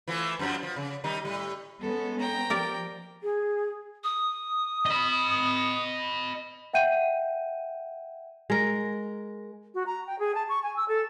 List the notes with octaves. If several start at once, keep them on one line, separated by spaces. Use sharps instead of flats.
E3 F3 A3
F#2 F3 F#3
F3
C#3
D#3 G3 D#4
A2 G3
G#3 B3 C#4 A4
G5 A#5
F3 G4 A#4 D5
G#4
D#6
D#5 B5
E5 F#5 G5 G6 D#7
G#3 A#4
F#4
A#5
G5
G#4
A5
C#6
G#5
E6
A4